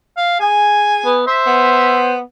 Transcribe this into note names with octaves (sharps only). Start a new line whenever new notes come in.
F5
G#4 G#5
B3
C5 E5
B3